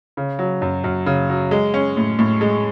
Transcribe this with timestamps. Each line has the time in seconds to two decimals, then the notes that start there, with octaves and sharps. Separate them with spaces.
0.17 C#3
0.39 F#3
0.62 F#2
0.84 F#2
1.06 C#3
1.30 F#3
1.51 G#3
1.74 C#4
1.97 A2
2.19 A2
2.41 G#3